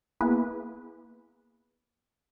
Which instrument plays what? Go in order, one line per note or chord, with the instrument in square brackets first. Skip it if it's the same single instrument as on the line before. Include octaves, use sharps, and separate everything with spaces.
[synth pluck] A#3 B3 E4 G#4 B4